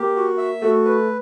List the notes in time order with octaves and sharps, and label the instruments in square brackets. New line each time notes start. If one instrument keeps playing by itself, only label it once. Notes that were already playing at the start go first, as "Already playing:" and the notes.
Already playing: [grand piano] A#3 [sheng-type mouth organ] G4
[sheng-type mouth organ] F#4
E5
[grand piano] A3 [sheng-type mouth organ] F#4
[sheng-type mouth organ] B4